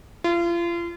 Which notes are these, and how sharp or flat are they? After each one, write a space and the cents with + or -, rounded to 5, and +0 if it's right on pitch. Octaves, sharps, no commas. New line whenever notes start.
F4 -35